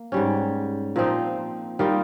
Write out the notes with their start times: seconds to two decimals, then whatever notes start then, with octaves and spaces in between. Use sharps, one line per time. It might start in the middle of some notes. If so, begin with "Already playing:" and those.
Already playing: A#3
0.12 G#2 G3 C#4
0.96 A#2 F3 C4 D#4
1.79 D#3 G3 A#3 F4